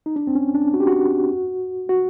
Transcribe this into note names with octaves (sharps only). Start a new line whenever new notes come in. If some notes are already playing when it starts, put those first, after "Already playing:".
D#4
D4
C4
C#4
D4
F#4
G4
F#4
F#4